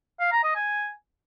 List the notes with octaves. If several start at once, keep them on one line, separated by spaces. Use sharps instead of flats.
F5
A#5
D#5
G#5